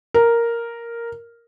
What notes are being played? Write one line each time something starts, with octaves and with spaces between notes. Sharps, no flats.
A#4